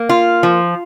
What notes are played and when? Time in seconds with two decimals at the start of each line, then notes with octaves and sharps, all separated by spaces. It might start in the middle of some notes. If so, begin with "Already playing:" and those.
Already playing: A#3
0.09 F4
0.43 F3